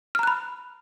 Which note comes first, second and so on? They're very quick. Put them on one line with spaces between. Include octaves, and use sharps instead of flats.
F6 A#5 F#6 B5